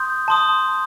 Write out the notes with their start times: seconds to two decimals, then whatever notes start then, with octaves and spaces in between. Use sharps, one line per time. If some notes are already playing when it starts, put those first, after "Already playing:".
Already playing: C6 D#6 G6
0.28 A5 C6 D#6